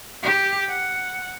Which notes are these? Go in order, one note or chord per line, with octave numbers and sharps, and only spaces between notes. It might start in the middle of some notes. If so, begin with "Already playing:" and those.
G4
F#5